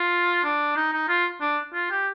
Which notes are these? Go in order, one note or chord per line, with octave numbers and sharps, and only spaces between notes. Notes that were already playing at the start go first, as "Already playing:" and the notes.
Already playing: F4
D4
D#4
D#4
F4
D4
F4
G4